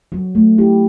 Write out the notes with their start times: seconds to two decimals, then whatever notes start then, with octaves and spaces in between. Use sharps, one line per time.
0.12 F#3 F#4
0.35 A3
0.58 E4 G4